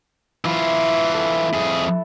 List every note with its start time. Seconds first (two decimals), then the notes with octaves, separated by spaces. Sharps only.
0.45 E3 E4 F4
1.14 A4
1.54 F2 G#4